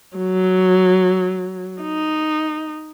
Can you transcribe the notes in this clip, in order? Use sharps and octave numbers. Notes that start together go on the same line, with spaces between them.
F#3
D#4